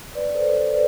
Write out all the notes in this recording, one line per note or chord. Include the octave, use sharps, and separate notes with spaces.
B4 D5
A4 C5
A4 C5
B4 D5